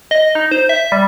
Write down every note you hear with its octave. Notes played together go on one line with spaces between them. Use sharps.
D#5
D#4
C5
E5
G3